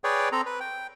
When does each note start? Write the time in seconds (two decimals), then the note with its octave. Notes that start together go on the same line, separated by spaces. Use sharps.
0.04 G#4 B4 C#5 D5 G5
0.32 C4 A4 A#5
0.46 B4
0.60 G5